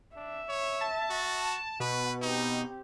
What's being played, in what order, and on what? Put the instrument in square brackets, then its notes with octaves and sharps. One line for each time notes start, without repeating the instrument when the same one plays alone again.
[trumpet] D4 [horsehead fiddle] E5
[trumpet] C#5
[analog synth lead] A5
[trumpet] F#4
[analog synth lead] B2 [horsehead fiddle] F#4 [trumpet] B4
[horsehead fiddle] C4 G4 [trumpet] D#4